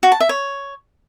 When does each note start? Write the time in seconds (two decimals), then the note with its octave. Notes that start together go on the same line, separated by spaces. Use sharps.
0.03 F#4
0.12 A5
0.20 E5
0.29 C#5